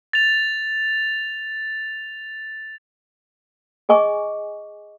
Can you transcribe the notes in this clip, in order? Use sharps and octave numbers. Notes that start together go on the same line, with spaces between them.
A6 F7
G#4 D#5 G#5 C#6 D6